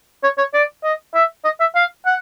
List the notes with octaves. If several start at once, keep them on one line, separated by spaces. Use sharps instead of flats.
C#5
C#5
D5
D#5
E5
D#5
E5
F5
F#5